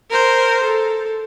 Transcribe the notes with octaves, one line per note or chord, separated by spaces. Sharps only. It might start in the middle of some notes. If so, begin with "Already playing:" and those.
A#4 C5
A4